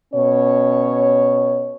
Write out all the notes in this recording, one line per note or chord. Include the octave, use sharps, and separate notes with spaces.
B2 C#4 C#5